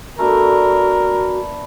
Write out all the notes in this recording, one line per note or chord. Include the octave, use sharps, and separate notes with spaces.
A3 B3 D4 F#4 A#4